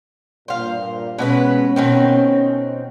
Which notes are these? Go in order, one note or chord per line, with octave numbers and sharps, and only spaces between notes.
G2 A#2 C5 F5
B2 G#3 C#4 B4
B2 D#3 C4